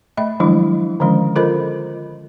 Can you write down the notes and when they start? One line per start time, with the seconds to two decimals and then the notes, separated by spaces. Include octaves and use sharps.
0.17 A3 D#5 E5 B5
0.40 D#3 F3 F#3 G#3 D4 E4
1.00 D3 D#3 F3 G#3 C#4
1.36 F4 A4 A#4 C5 D#5 B5